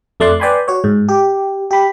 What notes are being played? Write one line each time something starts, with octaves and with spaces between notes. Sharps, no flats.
F2 A3 D5 C6 F#6
B4 D5 G5 G#5 B5 C6
F#4 C#5
G#2
G4
G4 B5